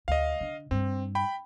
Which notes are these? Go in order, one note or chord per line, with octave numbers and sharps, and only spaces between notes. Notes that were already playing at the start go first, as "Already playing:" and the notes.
D2 D#5 F5
D3
G2 C4
G5 B5